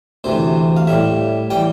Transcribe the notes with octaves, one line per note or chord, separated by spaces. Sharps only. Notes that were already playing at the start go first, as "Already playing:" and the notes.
D2 C3 E3 C5
F5
A2 G3 E5
E3 G3 G5